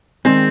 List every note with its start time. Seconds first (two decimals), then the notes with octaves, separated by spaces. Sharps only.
0.25 D#3 G#3 C4 D#4 G#4